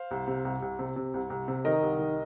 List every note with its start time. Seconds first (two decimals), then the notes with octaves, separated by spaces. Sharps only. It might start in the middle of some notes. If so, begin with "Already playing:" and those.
Already playing: C5 F5
0.11 C2
0.27 C3
0.45 C2
0.62 C2
0.79 C3
0.96 C3
1.14 C2
1.30 C2
1.48 C3
1.65 D#3 A#4 D#5
1.83 C2
1.99 D#3